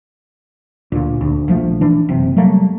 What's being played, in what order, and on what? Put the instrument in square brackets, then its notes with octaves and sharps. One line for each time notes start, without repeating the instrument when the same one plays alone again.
[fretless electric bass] D2 A#2
D2
A#1 F3 A3
E3 D4
F#1 C3
F#3 G3 A3 A#3